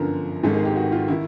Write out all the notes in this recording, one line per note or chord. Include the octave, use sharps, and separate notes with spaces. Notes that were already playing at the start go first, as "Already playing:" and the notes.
Already playing: G1 F#2 D3 F3 A#4
G#1 G#2 D#3 G#3 A4
G#4
G4
F#4
F4
D#3 E4